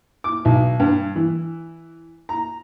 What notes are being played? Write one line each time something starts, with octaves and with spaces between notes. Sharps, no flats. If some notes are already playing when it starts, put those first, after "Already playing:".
D6
B1
G2
E3
A#5